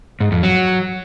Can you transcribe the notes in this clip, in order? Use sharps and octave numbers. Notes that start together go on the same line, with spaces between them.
G#2
F2
F#3